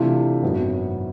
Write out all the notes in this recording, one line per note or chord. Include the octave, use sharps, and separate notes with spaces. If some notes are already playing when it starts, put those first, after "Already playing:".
Already playing: C3 E3 A3 D4 F4
G#1 F#2 D#3 F#3 B3